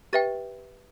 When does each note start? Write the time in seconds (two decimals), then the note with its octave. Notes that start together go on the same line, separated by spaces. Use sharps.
0.13 G4 B4 E5 G5 A6